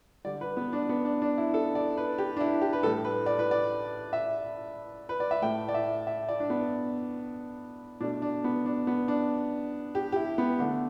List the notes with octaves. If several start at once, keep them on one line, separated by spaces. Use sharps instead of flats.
D3 G3 D5
B4
B3
D4
B3
D4
D4
E4
A4
D5
B4
G4
D4
E4
G4
B4
A2 G3 A4
B4
D5
B4
D5
E5
B4
D5
E5
A2 A3 G5
D5
E5
E5
D5
D4
B3
B2 A3 D4
D4
B3
D4
B3
D4
G4
G4
E4
B3
D3 A3